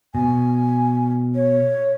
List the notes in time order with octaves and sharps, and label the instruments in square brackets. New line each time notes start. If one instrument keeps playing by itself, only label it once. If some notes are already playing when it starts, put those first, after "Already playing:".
[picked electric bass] B2 [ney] G#5
[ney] C#5